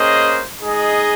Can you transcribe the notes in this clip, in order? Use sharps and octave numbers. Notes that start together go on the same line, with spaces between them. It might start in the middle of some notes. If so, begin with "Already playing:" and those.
Already playing: A#3 C#4 G#4 C5 D#5
G#3 D#4 G#4 D#5